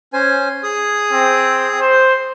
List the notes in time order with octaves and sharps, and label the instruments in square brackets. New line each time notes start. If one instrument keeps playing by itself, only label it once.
[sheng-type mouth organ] C#4 C5 G#5
G#4 D#6
[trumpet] C4
C5